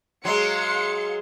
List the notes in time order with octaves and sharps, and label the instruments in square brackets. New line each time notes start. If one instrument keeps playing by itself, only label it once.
[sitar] F#3 G#3 [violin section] F5 C6 C#7